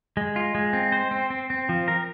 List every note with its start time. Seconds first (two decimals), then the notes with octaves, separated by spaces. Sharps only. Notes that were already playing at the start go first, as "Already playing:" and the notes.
0.17 G#3
0.36 F4
0.55 G#3
0.73 C4
0.92 C5
1.11 C4
1.30 C4
1.50 C4
1.69 F3
1.88 A#4